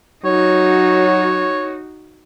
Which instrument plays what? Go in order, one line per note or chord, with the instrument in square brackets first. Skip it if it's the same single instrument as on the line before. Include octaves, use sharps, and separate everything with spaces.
[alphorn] F#3 [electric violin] D#4 F#4 [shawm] C#5